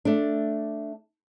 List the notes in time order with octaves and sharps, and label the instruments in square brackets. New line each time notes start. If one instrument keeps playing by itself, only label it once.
[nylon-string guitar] A3 D4